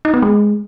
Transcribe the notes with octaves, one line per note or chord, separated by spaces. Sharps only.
D#4
B3
G#3